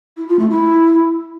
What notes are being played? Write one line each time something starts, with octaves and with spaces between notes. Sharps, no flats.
E4
F4
A3
E4